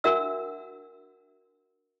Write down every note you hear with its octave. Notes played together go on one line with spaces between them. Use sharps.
D4 F#4 A#4 E5 F#5 E6